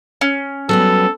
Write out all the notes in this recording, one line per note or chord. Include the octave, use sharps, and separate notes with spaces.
C#4
F#3 G3 B3 A4